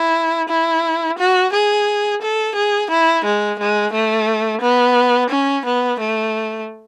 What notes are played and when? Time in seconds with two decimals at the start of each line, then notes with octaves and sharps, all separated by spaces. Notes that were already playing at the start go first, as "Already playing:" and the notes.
Already playing: E4
0.49 E4
1.18 F#4
1.53 G#4
2.22 A4
2.55 G#4
2.90 E4
3.25 G#3
3.59 G#3
3.93 A3
4.61 B3
5.30 C#4
5.65 B3
6.00 A3